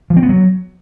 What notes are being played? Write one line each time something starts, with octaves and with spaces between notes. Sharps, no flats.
F3
C4
B3
F#3